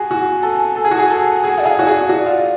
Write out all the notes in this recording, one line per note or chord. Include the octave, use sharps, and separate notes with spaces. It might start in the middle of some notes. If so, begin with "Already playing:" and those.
Already playing: F#4 G#4 G#5
F#4
A4
A4
G#4
F#4
G#4
A4
G#4 F#5
D5
G#4 F5
F#4 C#5
G#4 D5
F#4
F4